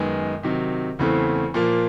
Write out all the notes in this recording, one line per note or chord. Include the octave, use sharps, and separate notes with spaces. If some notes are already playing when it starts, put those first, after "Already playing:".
Already playing: F#2 D#3 G#3 B3
C3 D#3 F#3
E2 C#3 E3 A3 C4
A#2 F3 A#3